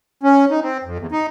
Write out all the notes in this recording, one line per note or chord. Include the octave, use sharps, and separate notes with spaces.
C#4
D#4
C4
F2
E2
D#4